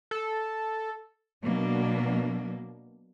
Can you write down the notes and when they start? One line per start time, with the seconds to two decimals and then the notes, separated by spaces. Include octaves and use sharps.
0.11 A4
1.42 B2 F#3 A#3 D4